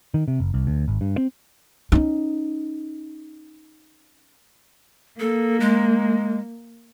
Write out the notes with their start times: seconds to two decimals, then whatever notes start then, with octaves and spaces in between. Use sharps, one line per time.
0.14 D#3
0.28 C3
0.40 F#1
0.54 C2
0.67 D2
0.88 G#1
1.01 G2
1.18 C4
1.92 C#4 D#4
5.20 A#3 A4
5.60 G#3